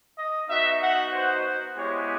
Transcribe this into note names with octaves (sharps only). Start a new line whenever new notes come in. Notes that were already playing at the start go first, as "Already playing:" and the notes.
D#5
B3 D#4 F#4 E5
F#5
C5
G#3 B3 E4 G4 C#5